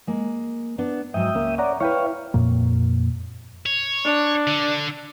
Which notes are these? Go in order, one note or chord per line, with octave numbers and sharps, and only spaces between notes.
G#3 A#3
B3 D4
G#2 F#3 E5 G5 D#6
C#2 A#3 C#4
C#5 D5 F#5 A#5
E4 B4 C#5 F5 G5 C#6
F2 A#2 A#3
C#5
D4
D3